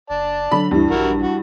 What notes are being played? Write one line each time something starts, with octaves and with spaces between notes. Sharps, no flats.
F#1 D5 A5
D3 F#3 B5
D2 G2 E3
A#1 E4 F#4 A#4
F#4